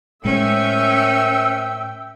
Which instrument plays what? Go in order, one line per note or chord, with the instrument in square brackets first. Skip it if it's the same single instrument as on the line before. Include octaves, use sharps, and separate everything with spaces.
[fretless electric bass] A2 G#3 [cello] C#4 [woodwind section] A#4 C5 E6 [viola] E5 G5